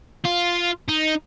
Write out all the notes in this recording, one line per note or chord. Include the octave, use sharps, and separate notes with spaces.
F4
D#4